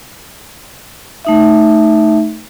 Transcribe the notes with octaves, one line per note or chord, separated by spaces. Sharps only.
A3 D#4 E5